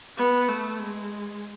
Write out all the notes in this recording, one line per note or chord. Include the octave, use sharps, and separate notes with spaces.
B3
A3
G#3